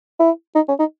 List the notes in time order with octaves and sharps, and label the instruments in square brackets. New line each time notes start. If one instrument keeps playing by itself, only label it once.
[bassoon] E4
D#4
C#4
D#4